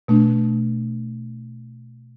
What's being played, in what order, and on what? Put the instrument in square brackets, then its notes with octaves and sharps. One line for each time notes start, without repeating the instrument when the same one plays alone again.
[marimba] B2 A3 D4